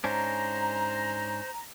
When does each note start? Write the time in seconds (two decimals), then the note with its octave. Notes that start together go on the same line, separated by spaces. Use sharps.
0.04 G#2 C#4 D4 C5 A#5